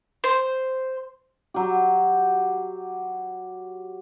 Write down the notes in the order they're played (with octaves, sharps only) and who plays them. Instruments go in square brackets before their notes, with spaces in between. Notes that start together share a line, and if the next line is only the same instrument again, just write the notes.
[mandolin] C5
[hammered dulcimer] F#3 G4